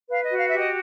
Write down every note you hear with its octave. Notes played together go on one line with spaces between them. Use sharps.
B4 F5
D#5
F#4
F5
G4 E5
D#5